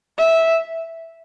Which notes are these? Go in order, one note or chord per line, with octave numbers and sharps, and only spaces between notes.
E5